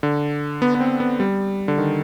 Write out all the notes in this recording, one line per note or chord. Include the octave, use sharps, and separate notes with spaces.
D3
B3
B3
C4
B3
G3
D3
D#3